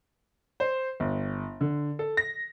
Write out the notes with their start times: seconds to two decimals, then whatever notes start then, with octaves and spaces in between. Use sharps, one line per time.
0.60 C5
1.00 G1
1.61 D3
1.99 A4
2.17 A#6